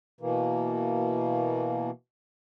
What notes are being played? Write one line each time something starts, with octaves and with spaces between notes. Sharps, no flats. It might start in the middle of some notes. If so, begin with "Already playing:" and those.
B2 E3 A#3